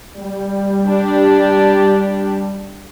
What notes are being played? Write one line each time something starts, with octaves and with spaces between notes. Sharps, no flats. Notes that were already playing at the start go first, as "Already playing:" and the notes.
G3
D4 G4